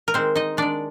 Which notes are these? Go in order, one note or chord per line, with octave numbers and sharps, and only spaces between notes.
A#4
D#3 G#3 C4 C5
D#4 D#5
D#3 G#3 D4 D5